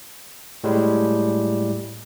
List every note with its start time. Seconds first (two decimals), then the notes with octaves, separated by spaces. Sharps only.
0.64 A2 G3 G#3